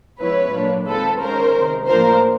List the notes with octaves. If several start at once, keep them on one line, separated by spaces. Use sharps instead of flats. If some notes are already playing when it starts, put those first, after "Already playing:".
C#3 F3 G#3 B3 E4 B4 C#5
A#2 F#3 A#3 D4 F4
D#3 G#3 C4 F4 A4 B4
D#3 G#3 C#4 A#4 C5
C3 D#3 G#3
A2 F3 A#3 D4 F4 A#4 C5